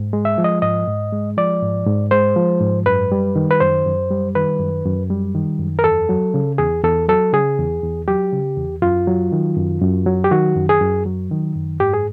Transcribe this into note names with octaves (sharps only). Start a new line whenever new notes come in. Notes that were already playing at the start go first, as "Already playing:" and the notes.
Already playing: G#2
G#3
E5
F3
D#5
G#2 D#5
G#2
G#3
F3 D5
G#2
G#2
G#3 C5
F3
G#2
F#2 B4
G3
D#3
B4
F#2 C5
F#2
G3
D#3 B4
F#2
F#2
G3
D#3
F#2
A#4
E2 A4
F#3
C#3
E2 G#4
E2 A4
F#3 A4
C#3 G#4
E2
E2
F#3 G4
C#3
E2
F#2 F4
F#3
D#3
F#2
F#2
F#3
G4
D#3 F#4
F#2
G#4
F#2
F#3
D#3
F#2
G#2 G4
G#4